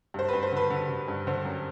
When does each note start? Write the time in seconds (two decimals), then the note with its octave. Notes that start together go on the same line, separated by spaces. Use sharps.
0.14 G2 C5
0.28 G2 B4
0.43 C5
0.52 D3 B4
0.70 D3
0.89 D3
1.08 G2
1.27 D3 C5
1.45 F#2